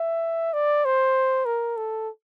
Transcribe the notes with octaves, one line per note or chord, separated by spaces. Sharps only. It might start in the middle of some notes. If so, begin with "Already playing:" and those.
Already playing: E5
D5
C5
A#4
A4